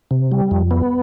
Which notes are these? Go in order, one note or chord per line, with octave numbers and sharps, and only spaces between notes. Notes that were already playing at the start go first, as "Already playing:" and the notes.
C3
G3
F2
B3